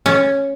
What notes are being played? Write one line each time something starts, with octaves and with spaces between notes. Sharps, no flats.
C#4